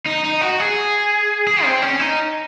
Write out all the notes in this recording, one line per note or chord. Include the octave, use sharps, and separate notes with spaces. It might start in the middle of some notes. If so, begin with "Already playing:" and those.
D#4
D#4
F#4
G#4
G#4
C4
C#4
D#4